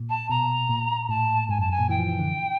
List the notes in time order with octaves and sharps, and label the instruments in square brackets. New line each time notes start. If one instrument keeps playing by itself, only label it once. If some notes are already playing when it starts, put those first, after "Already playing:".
Already playing: [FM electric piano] A#2
[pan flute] A5
[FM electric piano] B2 [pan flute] A#5
[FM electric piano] A#2
[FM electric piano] A2 [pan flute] A5
[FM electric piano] G#2 [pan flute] G#5
[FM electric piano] F#2 [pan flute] A5
[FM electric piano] F#2 [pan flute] G#5
[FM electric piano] A#2
[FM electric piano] E3 [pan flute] G5
[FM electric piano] F3
E3
D3